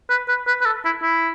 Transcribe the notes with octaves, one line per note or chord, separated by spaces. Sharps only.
B4
B4
B4
B4
A4
E4
E4